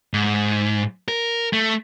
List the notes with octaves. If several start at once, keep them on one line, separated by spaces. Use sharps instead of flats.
G#2
A#4
A3